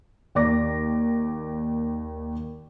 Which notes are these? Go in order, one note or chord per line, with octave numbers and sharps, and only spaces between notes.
D#2 D5 D6 A#6